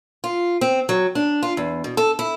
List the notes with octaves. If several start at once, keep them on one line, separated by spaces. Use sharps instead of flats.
F4
C4
F#3
D4
F4
E2
B2
A4
E4